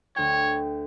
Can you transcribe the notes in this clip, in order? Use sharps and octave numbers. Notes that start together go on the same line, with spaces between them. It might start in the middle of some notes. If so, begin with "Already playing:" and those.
D2 C#5 G5